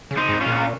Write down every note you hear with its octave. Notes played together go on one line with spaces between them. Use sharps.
C#3
C4 D#4
G#2
C#4 F4
A#2